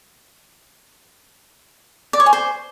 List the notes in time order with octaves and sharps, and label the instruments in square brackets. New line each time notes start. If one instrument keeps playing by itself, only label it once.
[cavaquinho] D5
C#5
G#5
C5